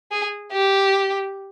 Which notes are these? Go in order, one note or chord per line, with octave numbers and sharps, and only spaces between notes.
G#4
G4